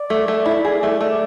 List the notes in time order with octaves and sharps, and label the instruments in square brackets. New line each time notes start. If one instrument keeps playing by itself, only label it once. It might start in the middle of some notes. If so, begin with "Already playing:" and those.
Already playing: [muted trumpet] D5
[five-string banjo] A3
A3
E4
G#4
A3
A3